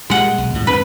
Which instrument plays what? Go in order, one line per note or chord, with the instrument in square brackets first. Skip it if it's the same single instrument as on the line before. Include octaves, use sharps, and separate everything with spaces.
[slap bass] A#2 G3 [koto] G#3 F#5
[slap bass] B1
D#2 A2
[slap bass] G2 D#3 C4 [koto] B4